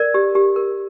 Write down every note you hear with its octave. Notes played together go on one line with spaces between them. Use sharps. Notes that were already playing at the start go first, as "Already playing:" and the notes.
Already playing: A#4 D5
G4
G4
A#4